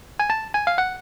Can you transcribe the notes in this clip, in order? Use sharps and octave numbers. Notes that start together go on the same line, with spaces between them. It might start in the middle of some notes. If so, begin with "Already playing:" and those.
G#5
A5
G#5
F5
F#5